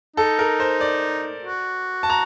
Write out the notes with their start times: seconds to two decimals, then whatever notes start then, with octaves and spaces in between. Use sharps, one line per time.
0.16 D#4 A4
0.39 A#4
0.60 C5
0.81 D5
1.45 F#4
2.03 A5
2.10 A#5